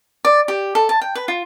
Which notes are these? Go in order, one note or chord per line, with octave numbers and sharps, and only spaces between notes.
D5
G4
A4
A5
G5
B4
F4